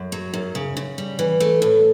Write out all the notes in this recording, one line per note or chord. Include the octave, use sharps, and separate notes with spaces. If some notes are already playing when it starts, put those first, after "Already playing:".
Already playing: F#2
F#3
F#2
C#3
C#3
G3
E3
A3
A2